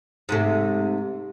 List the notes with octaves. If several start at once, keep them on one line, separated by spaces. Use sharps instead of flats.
G#2 C3 A3